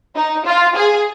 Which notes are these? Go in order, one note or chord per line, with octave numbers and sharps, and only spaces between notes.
D#4
F4
G#4